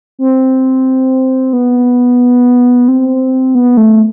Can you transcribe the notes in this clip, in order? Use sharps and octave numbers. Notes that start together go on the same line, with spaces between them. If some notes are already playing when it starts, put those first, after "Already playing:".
C4
B3
C4
B3
A3